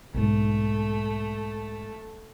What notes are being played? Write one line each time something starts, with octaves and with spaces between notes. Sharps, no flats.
B1 G#2 A3